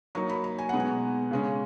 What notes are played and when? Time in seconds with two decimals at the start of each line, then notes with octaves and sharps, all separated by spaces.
0.15 F#3 A#3 D#4 C#6
0.29 B5
0.44 A#5
0.59 G#5
0.69 B2 G#3 B3 D#4 F#5
0.80 G#5
1.31 C#3 G#3 C#4